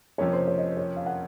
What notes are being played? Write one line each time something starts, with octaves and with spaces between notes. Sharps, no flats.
F2 C3 F3 A#3 C#4 C#5
C5
C#5
D#5
C5
C#5
F5
F#5